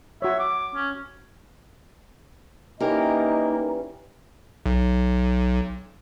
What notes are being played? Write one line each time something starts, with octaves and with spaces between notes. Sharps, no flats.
F#4 C#5 E5
D6
C#4
E3 G3 A#3 C#4 D#4 G4 A#4 D#5
B1